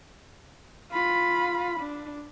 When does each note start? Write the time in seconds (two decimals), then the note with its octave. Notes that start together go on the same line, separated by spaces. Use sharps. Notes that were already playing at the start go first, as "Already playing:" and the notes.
0.91 F4 B5
1.80 D4